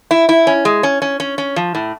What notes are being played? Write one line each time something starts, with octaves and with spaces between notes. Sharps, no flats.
E4
E4
C#4
G#3
C#4
C#4
C#4
C#4
F3
A2